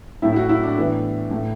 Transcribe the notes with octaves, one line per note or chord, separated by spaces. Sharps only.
A2 A3 E4
E4
F#4
E4
D4
A2 E3 B3
A2 A3